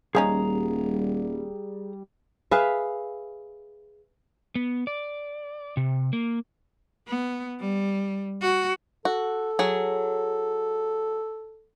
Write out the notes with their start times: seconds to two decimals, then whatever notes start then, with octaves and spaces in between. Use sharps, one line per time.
0.15 D#1 F3 G3 C#4 D#4 G#4 A#5
2.51 G#4 B4 E5 F5
4.55 B3
4.87 D5
5.77 C3
6.13 A#3
7.08 B3
7.60 G3
8.42 F#4
9.05 F#4 A4
9.59 F#3 G#4